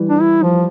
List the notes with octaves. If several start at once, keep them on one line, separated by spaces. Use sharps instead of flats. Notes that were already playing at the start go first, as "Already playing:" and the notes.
Already playing: E3 G3
D4
E4
F3